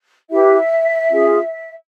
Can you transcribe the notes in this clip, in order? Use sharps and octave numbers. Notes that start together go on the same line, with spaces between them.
E4 G4 B4 E5
C#4 F4 G#4